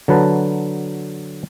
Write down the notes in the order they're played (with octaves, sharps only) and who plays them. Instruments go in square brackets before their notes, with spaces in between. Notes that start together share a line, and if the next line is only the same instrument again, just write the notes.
[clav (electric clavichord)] D3 F#3 B4 A5 A#5